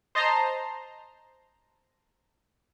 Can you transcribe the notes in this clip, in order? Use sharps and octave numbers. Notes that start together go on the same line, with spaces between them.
C5 D#5 A5 A#5 C6